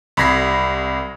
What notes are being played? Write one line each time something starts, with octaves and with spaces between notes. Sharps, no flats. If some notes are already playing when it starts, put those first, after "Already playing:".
C2 B5 G#6 A#6 C7